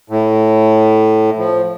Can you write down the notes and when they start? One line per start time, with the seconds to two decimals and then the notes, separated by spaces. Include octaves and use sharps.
0.10 A2
1.38 F3